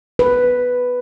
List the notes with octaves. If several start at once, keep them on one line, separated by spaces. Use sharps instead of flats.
B4